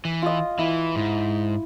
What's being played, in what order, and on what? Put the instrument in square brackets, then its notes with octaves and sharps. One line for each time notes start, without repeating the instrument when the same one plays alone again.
[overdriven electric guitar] E3
[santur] F4 D#5
[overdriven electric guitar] E3 [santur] E4
[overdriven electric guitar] G#2